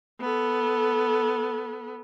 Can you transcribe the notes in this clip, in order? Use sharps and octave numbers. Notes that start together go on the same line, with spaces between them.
B3 A4